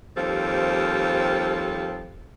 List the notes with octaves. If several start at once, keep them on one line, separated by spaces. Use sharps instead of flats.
D#2 F3 G3 C4 A4